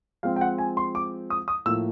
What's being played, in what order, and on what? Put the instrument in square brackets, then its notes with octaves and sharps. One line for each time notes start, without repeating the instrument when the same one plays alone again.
[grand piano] F3 G#3 C4 F5
G5
F#5
G#5
C6
D6
D#6
D#6
A2 F3 A#3 E6